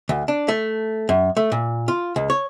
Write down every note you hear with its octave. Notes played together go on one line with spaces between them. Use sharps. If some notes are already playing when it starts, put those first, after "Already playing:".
D2
D4
A3
F#2
A3
A#2
F4
C#2
C#5